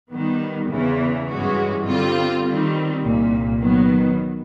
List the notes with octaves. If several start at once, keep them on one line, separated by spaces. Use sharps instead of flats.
D#3 G3 B3
E2 C#3 E3
G2 E3 G#3 C#4 F#4
D3 G3 C4 F4
D#3 G3 C4
C2 A#2 G3
D#3 F#3 B3